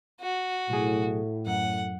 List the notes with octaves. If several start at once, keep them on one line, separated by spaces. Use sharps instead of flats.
F#4
B1 A2 G#4
F#2 F#5